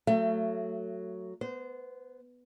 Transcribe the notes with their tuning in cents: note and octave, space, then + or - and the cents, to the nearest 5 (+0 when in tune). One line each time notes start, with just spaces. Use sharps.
F#3 +0 A3 +20 E5 +40
B3 +0 C5 -25